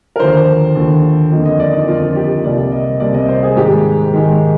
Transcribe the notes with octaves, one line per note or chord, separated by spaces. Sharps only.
A#4
D#2 D3 F3 C5
D#2 D3 F3
F2 D3 F3 A#3 D#5
D#5
D5
D#4
F2 D3 F3 A#3 F4
G4
C2 C3 G3 A#3 D5
D#5
C2 C3 G3 A#3 D5
D#5
C5
G#4
G#2 D#3 G#3 G4
G#2 D#3 G#3